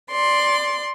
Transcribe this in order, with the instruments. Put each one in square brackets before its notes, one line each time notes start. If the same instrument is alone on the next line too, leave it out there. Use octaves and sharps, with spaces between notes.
[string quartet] D5 C6